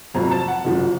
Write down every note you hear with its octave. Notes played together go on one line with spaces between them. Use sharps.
F1 F2 C3 F#3 A#5
A5
F#5
F#1 F#2 F3